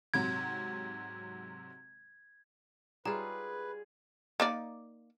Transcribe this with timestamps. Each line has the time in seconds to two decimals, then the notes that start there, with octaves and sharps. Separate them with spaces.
0.14 G#2 C3 F#3 G#6
3.06 G3 F4 G#4 B4 A#5
4.40 A#3 D#4 D5